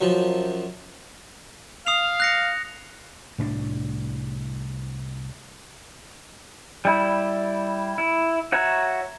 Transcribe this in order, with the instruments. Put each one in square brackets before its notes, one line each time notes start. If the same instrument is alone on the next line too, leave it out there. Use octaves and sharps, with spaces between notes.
[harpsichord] F#2 F3
[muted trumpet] F5 [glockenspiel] D#6 C7 F7
[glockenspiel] F#6 A#6 C#7
[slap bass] C2 A2 C#4 D4
[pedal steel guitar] G3 E4
E4
F#4 C#5 E5 A#5